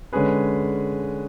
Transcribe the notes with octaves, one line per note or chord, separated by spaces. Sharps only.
D3 G#3 C#4 G#4 B4